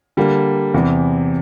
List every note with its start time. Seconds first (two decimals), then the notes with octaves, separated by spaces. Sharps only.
0.17 D3 G3 A#3
0.74 E2 C3 E3